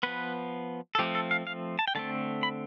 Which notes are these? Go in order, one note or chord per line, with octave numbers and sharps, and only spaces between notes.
F3 B3 B4
A4
F3 A3 C4 G4
A4
F5
F5
A5
G5
D3 A3 C4 A5
B5